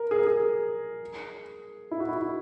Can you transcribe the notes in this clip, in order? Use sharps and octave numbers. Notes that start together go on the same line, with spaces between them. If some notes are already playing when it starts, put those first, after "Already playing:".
Already playing: A#4
G#4
A#4
G#4
E4
F#4
E4
E4